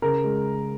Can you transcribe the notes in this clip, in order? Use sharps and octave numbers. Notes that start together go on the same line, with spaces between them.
C#3 A#4
G#3